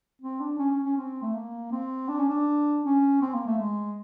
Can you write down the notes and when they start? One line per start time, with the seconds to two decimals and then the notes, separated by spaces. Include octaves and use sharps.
0.22 C4
0.40 D4
0.59 C#4
0.71 C#4
0.84 C#4
0.97 C4
1.22 A3
1.34 A#3
1.72 C4
2.08 D4
2.19 C#4
2.29 D4
2.84 C#4
3.22 C4
3.34 A#3
3.47 A3
3.59 G#3